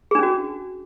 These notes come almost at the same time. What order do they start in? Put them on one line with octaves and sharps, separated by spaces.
G#4 D4 C#4 F#4